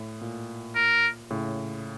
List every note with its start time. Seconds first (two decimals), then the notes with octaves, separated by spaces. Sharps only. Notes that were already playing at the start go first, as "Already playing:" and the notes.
Already playing: A2
0.21 A#2
0.75 A#4
1.30 A2 C#3